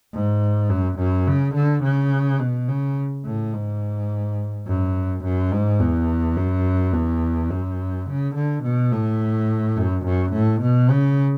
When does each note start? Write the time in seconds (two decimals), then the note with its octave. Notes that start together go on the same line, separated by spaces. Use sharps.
0.13 G#2
0.70 F#2
0.99 F#2
1.27 C#3
1.54 D3
1.83 C#3
2.40 B2
2.68 C#3
3.25 A2
3.54 G#2
4.67 F#2
5.24 F#2
5.52 G#2
5.80 E2
6.36 F#2
6.93 E2
7.50 F#2
8.06 C#3
8.35 D3
8.63 B2
8.92 A2
9.77 F#2
10.05 F#2
10.33 A2
10.61 B2
10.91 C#3